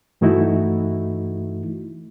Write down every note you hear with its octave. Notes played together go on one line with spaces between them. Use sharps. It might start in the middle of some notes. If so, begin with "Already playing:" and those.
G2 E3 A3 D#4 E4 F#4